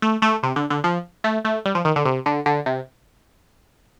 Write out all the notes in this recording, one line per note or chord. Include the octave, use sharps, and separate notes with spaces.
A3
A3
C3
D3
D3
F3
A3
A3
G3
F3
D#3
D3
C3
D3
D3
C3